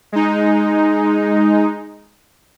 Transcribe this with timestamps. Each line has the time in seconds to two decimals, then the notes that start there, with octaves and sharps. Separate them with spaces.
0.12 G#3 D#4